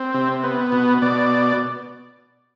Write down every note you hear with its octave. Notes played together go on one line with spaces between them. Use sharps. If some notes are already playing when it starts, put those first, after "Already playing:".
Already playing: C4
C3
B3
B2
B2 D5